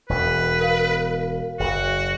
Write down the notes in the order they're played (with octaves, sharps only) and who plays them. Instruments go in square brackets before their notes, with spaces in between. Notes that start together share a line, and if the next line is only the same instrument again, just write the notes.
[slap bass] E1 E2 [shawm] B4
[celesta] A#4 F5
[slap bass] F#1 [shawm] F#4